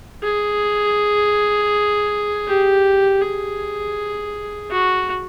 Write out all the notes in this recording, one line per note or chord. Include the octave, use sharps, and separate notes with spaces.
G#4
G4
G#4
F#4